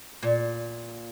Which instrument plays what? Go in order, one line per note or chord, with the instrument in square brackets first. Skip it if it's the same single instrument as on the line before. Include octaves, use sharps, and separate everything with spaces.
[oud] A#2